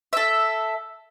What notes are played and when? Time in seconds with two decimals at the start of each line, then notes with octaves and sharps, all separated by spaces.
0.13 A4 E5